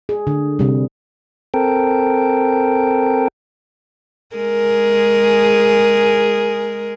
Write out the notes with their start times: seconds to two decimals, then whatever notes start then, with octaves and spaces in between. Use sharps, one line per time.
0.09 G#4
0.27 D3
0.59 C3 G3
1.54 C4 A4 A#4 G5
4.36 G#3 G#4 A#4